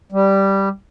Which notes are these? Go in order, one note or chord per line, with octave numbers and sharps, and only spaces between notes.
G3